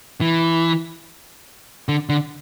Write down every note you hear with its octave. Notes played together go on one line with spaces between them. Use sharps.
E3
D3
D3